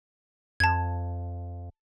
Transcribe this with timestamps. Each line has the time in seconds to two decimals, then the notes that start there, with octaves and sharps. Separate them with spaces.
0.60 F2 A5 G#6